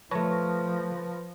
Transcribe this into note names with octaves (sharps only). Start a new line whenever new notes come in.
F3 A3 B4 C#5 A5 A#6